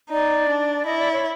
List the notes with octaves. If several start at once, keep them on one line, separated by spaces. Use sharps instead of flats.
D#4 D5
D4
E4 D#5
D5
C#5